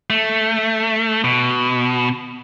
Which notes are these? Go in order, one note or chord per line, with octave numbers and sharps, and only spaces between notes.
A3
B2